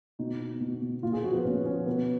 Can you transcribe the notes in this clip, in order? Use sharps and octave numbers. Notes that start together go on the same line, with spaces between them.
B2 D#4
B2
B2
B2
A#2 F4
G#4
F3 F#4
B3
A#2 C#4
F3 C#4
B2 B3